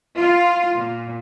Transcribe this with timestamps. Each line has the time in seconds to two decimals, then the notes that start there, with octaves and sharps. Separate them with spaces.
0.18 F4
0.76 A#2